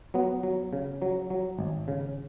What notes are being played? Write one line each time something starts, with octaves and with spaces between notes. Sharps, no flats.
F#3 B3
F#3
C#3
F#3
F#3
G#1
C#3